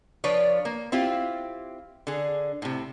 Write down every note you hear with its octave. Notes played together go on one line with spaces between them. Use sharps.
F3 D4 F4 B4 C#5 D5
A#3
C4 E4 F4 G4
D3 G#4
A2 C3